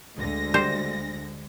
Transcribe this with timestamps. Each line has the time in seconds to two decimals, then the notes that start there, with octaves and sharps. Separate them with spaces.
0.17 D2 D3 G#3 A#6
0.54 G3 C5